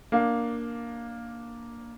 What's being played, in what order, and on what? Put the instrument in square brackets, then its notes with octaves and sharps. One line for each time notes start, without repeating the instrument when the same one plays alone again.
[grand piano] A#3 D4 F5